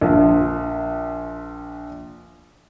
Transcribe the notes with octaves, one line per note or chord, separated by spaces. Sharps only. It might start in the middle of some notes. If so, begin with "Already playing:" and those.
A#1 F3